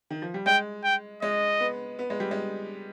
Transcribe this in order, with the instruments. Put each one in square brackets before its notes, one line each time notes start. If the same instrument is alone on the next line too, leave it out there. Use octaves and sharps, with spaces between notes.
[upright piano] D#3
F3
G3
[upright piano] G#3 [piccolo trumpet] G5
[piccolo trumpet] G5
[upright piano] G#3 [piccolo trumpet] D#5
[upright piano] B3
B3
G#3
G3
G#3